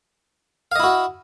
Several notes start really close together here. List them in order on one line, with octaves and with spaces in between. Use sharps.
F5 D#5 E4 F#4